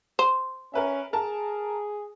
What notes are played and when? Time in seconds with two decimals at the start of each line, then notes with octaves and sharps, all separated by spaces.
0.19 C5
0.74 C#4 A#4 B4 E5
1.13 G#4 A#4 A5